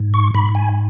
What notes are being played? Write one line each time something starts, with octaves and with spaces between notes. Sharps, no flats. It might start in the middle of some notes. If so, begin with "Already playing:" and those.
Already playing: G#2
C#6
G#2 B5
G#5